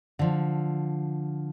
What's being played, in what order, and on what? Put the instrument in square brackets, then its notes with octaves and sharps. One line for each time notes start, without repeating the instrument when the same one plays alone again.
[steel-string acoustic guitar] D3 F3